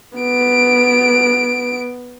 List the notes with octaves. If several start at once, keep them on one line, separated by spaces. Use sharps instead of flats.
B3 D7